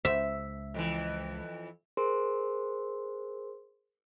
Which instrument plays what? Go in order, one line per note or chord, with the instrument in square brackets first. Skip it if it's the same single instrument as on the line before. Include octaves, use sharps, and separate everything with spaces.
[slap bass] C#2 [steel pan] C5 [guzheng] E5
[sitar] F2 D3 E3
[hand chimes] G#4 A#4 C5 C6